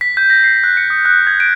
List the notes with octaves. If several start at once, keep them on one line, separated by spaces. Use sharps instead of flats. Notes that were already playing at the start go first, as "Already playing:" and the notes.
B6
G6
A#6
C7
F#6
C#7
D#6
F#6
G#6
D7